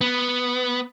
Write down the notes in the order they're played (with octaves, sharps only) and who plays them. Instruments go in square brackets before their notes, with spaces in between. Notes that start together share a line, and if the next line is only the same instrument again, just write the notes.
[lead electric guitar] B3